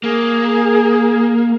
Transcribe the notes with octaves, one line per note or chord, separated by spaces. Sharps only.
A#3 G#4